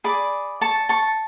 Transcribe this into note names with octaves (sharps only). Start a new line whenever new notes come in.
G#4 D5 B5 D6
A5 C#6
A5 C#6